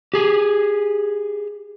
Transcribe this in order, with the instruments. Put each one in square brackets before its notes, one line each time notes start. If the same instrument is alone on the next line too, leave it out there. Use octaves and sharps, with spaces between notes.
[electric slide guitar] G4 G#4